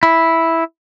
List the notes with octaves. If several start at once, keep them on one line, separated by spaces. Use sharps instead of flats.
E4